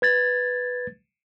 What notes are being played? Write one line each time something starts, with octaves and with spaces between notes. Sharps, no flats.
B4 G#6 A6